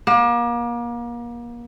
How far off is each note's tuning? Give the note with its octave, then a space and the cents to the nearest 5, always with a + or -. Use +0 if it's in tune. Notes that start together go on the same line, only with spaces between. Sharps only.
A#3 +35